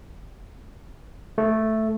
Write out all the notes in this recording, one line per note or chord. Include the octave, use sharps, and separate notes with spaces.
A3